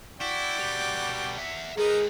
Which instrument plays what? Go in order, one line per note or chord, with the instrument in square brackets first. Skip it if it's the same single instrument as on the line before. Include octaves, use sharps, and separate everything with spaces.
[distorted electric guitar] E4 [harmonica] F#4 D5 G5
[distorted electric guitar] B2 G3
E5 F#5
[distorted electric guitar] G#3 B4 [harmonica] D#4 A#4 [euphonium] G#4